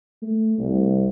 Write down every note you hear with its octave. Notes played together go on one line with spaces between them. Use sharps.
A3
C2